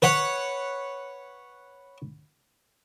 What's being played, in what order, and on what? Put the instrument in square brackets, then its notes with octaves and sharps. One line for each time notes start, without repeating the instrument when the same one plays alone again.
[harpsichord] B4 C#5 F#5